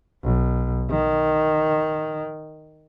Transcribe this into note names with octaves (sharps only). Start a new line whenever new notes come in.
B1
D#3